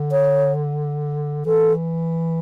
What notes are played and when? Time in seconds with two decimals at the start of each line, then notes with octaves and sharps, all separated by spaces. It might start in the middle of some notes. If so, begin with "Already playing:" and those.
Already playing: D3
0.12 C#5
1.46 E3 A4